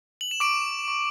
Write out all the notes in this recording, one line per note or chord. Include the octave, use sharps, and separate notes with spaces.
F#7
E7
C#6 D6 D7
C#6